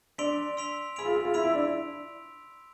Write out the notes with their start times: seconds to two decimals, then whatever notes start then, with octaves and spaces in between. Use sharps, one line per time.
0.18 D4 C6 E6 B6 D7 F7
0.57 C6 E6 B6 D7 F7
0.96 G#4 B5 E6 B6 D7 F7
1.05 F4
1.15 G#4
1.25 F4
1.34 E4 B5 E6 B6 D7 F7
1.44 E4
1.54 D4